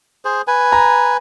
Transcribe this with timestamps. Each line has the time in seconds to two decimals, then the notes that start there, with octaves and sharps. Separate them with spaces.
0.25 G#4 C5
0.47 B4 G#5
0.72 A#5